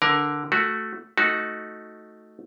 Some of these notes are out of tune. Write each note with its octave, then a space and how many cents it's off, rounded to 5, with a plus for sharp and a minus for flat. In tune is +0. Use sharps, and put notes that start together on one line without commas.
D3 +0 A#4 +15
A3 +0 F#4 +0
A3 +0 D#4 +10 F#4 +0